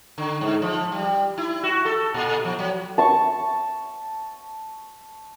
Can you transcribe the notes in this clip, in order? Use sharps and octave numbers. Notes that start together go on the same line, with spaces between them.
D3
G#2
F3
G3
E4
F#4
A4
A#2
F3
F#3
A5 C#6